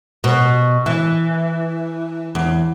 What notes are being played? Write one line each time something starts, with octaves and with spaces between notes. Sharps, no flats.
B2
E3
E2